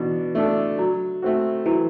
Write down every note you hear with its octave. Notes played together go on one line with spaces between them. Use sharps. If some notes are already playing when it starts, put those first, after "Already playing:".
Already playing: B2 E3 D4
A3 D4 A4
F#3
A3 C4 F#4
E3 F#3